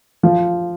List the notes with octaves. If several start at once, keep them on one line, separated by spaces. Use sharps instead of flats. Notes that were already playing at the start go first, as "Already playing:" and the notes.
F3